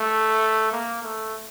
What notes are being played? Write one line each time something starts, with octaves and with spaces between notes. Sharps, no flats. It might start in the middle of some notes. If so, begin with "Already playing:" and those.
Already playing: A3
A#3
A3